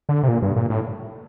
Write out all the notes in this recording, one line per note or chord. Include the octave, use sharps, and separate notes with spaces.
D3
C3
A#2
G2
A#2
A2